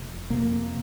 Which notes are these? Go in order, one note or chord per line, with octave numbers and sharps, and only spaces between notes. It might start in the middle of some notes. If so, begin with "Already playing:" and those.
Already playing: F1
F2 C3 A#3